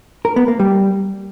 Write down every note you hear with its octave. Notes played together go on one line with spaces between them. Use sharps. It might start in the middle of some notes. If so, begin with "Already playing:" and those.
A#4
B3
A#3
G3